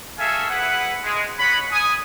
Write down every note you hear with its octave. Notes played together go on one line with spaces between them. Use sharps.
F#4 G#4 A4 E5 F5 G#5
E4 G#4 B4 F#5
G#3
C#5 D#5 F#5 B5
G#5 D#6